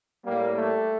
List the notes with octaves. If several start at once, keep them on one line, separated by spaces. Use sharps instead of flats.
A2 G3 A#3
A3